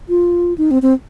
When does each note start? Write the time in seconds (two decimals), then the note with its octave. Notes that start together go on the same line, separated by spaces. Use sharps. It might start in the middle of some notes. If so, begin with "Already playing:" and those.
0.09 F4
0.58 D#4
0.71 C4
0.82 C4